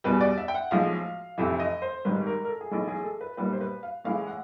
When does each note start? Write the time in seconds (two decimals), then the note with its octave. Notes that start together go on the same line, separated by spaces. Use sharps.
0.04 E2 B2 G3 B4
0.21 D5
0.38 E5
0.48 G5
0.55 F#5
0.71 B1 A2 F3 G#3 F5
1.38 F1 F2 C3 E3 E5
1.60 D#5
1.82 C5
2.05 G#1 G#2 D#3 G3 B4
2.27 A#4
2.44 A#4
2.49 A4
2.61 G#4
2.71 B1 A2 E3 G#3 A4
2.88 G#4
3.04 A4
3.21 B4
3.37 B1 A#2 G3 B4
3.53 C5
3.61 B4
3.83 F5
4.04 A1 A2 E3 G#3 F5
4.27 F#5